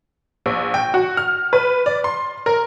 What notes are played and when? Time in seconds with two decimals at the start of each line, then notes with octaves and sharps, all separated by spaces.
0.46 A#1
0.74 G5
0.94 F#4
1.17 F6
1.53 B4
1.86 D5
2.04 C6
2.46 A#4